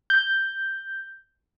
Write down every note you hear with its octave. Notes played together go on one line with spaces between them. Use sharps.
G6